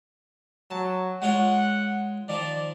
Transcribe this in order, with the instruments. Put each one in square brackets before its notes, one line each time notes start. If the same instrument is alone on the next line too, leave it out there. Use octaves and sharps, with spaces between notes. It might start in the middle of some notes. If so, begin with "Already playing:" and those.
[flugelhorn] F#3 [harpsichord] A5
[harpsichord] G#3 F4 C#5 [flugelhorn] F#5
[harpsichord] D#3 F3 [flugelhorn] D5